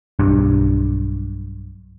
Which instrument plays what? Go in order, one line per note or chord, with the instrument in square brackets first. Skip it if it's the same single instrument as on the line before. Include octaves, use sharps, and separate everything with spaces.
[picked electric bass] B1 G2